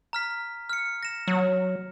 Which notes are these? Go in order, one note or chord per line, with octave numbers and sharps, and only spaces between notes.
A#5 F6 B6
F6 C#7
A#6 E7
F#3